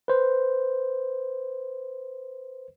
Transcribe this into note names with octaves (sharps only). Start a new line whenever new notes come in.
B4 C5